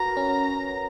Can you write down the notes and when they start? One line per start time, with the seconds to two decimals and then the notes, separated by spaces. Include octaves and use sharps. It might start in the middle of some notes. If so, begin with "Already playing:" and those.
Already playing: F#4 A#4 B4 A#5
0.17 C#4